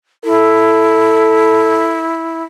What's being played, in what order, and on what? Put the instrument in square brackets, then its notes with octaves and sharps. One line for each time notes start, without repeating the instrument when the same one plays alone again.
[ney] E4 [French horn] A4